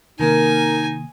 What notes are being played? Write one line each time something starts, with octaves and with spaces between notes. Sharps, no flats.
C3 D#3 A#3 D#4 A#4 G#5